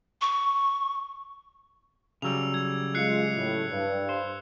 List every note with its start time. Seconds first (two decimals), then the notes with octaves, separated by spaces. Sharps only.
0.21 C#6
2.22 C#3 F#3 G3 E6 F7
2.54 G#6
2.95 G#3 F4 F#6 C7 C#7
3.36 A2
3.70 G2
4.09 C5